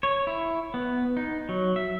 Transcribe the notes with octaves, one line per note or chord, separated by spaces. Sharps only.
C#5
E4
B3
D#4
F#3
E5